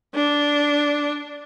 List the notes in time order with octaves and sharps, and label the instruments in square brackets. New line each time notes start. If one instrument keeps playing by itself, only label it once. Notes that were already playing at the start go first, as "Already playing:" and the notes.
[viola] D4